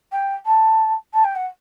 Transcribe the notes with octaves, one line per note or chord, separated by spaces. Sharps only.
G5
A5
A5
G5
F#5